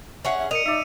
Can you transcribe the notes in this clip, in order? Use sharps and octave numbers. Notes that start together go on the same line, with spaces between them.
C#4 G#4 E5 F#5
E5
A#4 D#5 C#7 D#7 F7
D#4 D5 E5